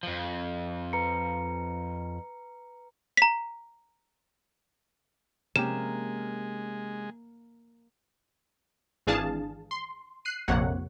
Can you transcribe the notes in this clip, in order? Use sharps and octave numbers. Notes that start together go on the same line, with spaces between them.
F2 F3
B4 A#5 C#7
A#5 B6
C3 G#3 A#3 C#4 G4 E7
G#1 E3 D4 G#4 F5 A5
C6
F#6 C7 D#7
A#1 F2 C3 A#3 C#5 F#5